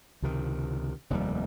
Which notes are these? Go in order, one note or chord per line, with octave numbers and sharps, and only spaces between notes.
C#2 C3 D#3
F1 D#2 D#3 G3